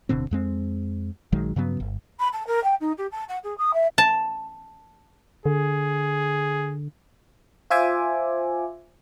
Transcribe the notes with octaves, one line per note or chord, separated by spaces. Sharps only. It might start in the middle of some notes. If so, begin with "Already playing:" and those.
D1 B2 D3 C4
F2 G#3 C4
A#1 D#3 F#3 G#3
G2 C#3 F#3 B3
G1
B5
A5
A#4
G5
D#4
G4
A5
F#5
G#4
D#6
E5
A5
D3 G#4
F4 C5 E5 G#5 D6